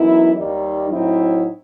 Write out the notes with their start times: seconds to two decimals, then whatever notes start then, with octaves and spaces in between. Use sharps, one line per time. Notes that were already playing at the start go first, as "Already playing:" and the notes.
Already playing: F#2 E3 B3 D#4 E4
0.33 D#2 D#3 G3 D#4
0.89 A2 F#3 C4 D#4 E4